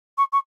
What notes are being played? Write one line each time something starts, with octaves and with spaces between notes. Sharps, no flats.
C#6
C#6